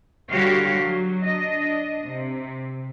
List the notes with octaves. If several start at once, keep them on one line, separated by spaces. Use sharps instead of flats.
D3 G3 F#4 G4 C#5 F5
F#3
D4 D#5
C3